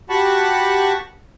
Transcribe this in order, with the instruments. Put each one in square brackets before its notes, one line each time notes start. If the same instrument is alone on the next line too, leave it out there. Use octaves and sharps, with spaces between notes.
[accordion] F#4 G4 F#5 A5 B5 C#6